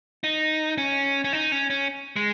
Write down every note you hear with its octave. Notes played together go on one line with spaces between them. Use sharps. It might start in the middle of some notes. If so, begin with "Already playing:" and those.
D#4
C#4
C#4
D#4
C#4
C#4
G#3